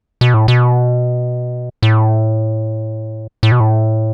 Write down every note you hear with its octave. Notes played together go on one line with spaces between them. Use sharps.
B2
A2
B2
A2
A2
B2
A2